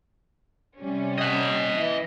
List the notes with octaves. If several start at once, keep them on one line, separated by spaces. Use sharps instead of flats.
C3 G3 C#4
D#5 F#5
E3